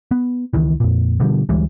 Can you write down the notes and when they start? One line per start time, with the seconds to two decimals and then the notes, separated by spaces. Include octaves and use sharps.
0.11 B3
0.53 C#2 D#3 E3
0.80 F2 A#2
1.20 B2 D3 F3 G3
1.49 D2 E3 G3 G#3